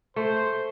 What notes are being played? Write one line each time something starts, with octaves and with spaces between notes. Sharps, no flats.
A3 C5